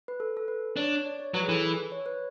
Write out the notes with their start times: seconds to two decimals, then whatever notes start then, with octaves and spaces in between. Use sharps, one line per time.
0.08 B4
0.20 A4
0.37 A4
0.48 B4
0.77 D4 C#5
1.06 D5
1.20 C#5
1.34 F#3 B4
1.43 G#4
1.48 E3 A4
1.63 B4
1.92 C#5
2.06 B4